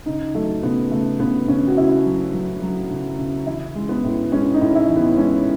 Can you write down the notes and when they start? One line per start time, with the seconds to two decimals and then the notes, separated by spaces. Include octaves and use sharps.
0.06 C#3 D#4
0.35 F#3 A3
0.63 C#3 B3
0.91 C#3 A3
1.20 C#3 B3
1.48 C#3 C#4
1.68 F#4
1.77 C#3 E4
2.05 F#3
2.33 F#3
2.62 F#3
2.90 C#3
3.19 C#3
3.47 E3 E4
3.75 G#3
3.89 B3
4.04 A2
4.32 G#3 C#4
4.54 D#4
4.61 A2
4.76 E4
4.89 E3
4.97 B3
5.17 G#3 C#4